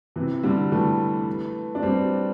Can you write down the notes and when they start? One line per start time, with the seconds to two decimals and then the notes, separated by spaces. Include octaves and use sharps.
0.16 C3 E3
0.43 D3 G3
0.72 E3 A3
1.75 D4
1.83 G3 C4